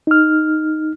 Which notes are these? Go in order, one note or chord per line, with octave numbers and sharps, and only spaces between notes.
D#4 F6